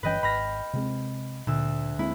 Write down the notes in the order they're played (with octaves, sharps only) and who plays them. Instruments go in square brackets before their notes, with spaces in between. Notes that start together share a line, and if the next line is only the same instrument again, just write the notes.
[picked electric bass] G1 E3 C#4 [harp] B4 D#5 G5
[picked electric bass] G#1 [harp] B5 F6 A#6
[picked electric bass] C3 G#3 C4
[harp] D2 E6 [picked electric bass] A#2
[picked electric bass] G#3 A#3 C4 [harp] E4